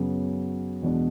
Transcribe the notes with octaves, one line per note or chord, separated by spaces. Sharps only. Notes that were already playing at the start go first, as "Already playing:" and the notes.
Already playing: F#2 C#3 F#3 B3 F#4
E2 B2 G#3 B3 D4